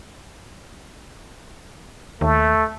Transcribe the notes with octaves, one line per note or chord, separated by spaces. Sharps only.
D#2 A3